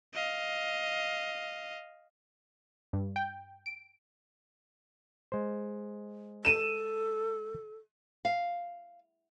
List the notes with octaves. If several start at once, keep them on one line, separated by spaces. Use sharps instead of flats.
D#5 F5
G2
G5
D7
G#3 C5
A4 D#7 E7
F5